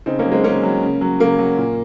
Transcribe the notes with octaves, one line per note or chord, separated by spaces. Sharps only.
C#3 C4 D#4
A#3 C#4
F#3
G#3 C4
C#3 A#3 C#4
F#3
C#3
F#3
C#3 A#3
F#3
A#2